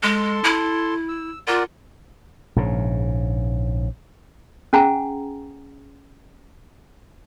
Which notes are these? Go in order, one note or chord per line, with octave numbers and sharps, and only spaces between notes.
G#3 A4 A5 C6
E4
E6
F4 A#4 D5 F#5
A#1 G#2 C#3
C#4 G#4 F#5 G#5 A#5